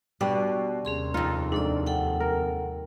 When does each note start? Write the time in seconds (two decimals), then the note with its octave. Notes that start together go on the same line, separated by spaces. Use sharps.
0.21 B2 G3 D4
0.85 D#2 C3 C#4 G#4 C6
1.14 F2 D#4 F4
1.52 G#2 D4 A4 D5
1.86 A4 F#5 G5
2.20 A#4